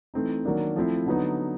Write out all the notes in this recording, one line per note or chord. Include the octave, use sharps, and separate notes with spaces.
E3 A3 C4 D#4
D#3 F#3 A#3 D4
F3 A3 C4 E4
D3 F#3 B3 D#4